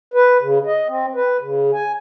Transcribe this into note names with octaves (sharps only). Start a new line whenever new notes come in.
B4
C#3
D#5
C4
B4
C#3
G#5